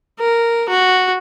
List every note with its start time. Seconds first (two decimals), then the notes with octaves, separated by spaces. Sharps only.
0.20 A#4
0.69 F#4